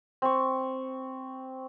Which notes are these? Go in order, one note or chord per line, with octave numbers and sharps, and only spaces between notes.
C4 C#6